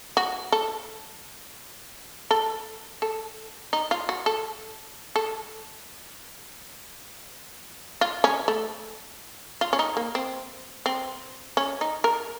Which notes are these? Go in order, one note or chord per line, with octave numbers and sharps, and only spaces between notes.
F#4
A4
A4
A4
D#4
F4
F#4
A4
A4
F4
C#4
A3
F4
C#4
D#4
A#3
C4
C4
C#4
D#4
A#4